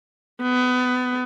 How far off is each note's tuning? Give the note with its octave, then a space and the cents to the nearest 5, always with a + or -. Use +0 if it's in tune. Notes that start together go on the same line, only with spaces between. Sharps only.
B3 +25